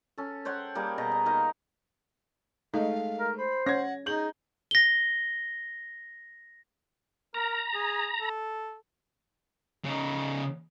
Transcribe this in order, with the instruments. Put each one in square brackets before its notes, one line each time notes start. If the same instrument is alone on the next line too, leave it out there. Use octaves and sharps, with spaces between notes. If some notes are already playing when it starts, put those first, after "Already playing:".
[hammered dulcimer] C#4 A4
C5 C#5 F#5 G5
G3 A#3 G#4
B2 D#5 A#5
D#5
A#3 D#4 D#5 F5
[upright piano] G#3 A3 [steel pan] D#4 [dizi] F5
[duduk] A#4
[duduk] C5 [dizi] B5
[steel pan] C#4 [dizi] F#5 [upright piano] G#6 A#6
[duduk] D#4 [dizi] G#4 [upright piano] G6 F#7
[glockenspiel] A#6 G7
[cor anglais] A#4 [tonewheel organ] A#5
[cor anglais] G#4
A4
[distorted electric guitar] C#3 D#4